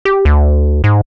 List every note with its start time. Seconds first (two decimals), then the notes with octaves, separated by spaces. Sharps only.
0.05 G4
0.25 D2
0.84 G#2